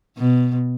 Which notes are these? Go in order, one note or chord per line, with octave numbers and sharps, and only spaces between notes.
B2